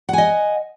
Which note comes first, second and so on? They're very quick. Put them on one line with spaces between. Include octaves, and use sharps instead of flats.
F#5 G#5 D#5